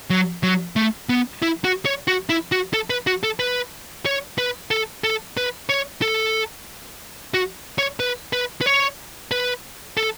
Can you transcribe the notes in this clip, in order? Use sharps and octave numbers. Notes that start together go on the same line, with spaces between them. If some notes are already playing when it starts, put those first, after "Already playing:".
F#3
F#3
A3
B3
E4
F#4
C#5
F#4
E4
F#4
A4
B4
F#4
A4
B4
C#5
B4
A4
A4
B4
C#5
A4
F#4
C#5
B4
B4
B4
C#5
B4
A4